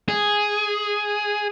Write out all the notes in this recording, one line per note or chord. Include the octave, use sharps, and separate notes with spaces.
G#4